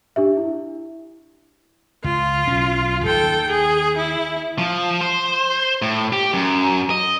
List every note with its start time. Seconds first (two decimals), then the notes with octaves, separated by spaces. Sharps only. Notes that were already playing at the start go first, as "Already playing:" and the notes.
0.16 D4 G4 E5
0.37 E4
2.04 C#2 F4
2.47 B1 F#3 C#4
3.05 D#2 D#3 A4 G5
3.49 G#4
3.96 E4
4.59 F3
5.01 C5
5.82 A2
6.13 G4
6.34 F#2
6.90 D#5